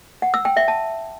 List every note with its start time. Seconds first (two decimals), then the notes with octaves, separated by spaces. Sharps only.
0.22 F#5
0.34 E6
0.45 G5
0.57 E5
0.68 A5